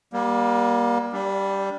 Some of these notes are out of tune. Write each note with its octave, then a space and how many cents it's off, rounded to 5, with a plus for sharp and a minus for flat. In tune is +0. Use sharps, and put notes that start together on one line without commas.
G3 +0 A#3 +30
G3 +0 D4 -35